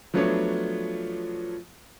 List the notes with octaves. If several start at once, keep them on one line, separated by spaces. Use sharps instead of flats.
F3 F#3 A3 B3 D4 C#5